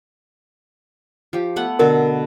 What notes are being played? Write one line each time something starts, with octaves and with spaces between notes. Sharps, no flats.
F3 G4
A3 B3 F#5
B2 D3 A4 A#4